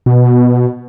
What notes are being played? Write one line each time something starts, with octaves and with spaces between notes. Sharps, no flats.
B2